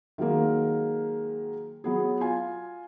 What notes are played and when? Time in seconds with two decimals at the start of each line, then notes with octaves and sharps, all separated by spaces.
0.18 D#3 F#3 G#3 A#3
1.84 F#3 B3 G#4
2.20 F4 G#5